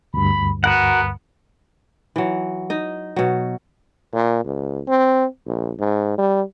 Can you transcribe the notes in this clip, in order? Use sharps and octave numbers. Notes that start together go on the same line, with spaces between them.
D2 G2 B5
B3 F#4 A#4 F#5
E3 F#3
D#4 D#5
B2 F#3
A#2
C#2
C4
A#1
G#2
G3